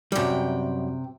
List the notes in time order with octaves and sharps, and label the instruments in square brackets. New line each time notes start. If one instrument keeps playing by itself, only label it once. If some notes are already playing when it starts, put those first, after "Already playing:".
[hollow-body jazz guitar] F#2 G3 [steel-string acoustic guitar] C3 G5